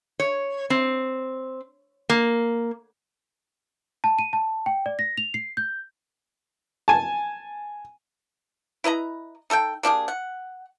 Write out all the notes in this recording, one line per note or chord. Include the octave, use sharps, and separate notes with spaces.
C#5
C4
A#3
A5
D#7
A5
G5
D5
A#6
F7
C7
G6
G#5 A5
E4 B4 D#5 A#5
D#4 A4 F#5 G5
A#3 D4 G4 G#4
F#5